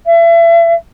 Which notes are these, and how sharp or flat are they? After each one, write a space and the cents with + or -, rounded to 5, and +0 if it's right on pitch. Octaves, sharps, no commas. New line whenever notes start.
E5 +35